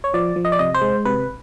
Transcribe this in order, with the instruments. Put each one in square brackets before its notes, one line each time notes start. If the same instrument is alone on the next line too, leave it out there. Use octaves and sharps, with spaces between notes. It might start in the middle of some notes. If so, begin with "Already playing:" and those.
[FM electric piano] C#5
F3 D5
F3
D#5
D5
C3 D#5
C5
G#3
C3 B4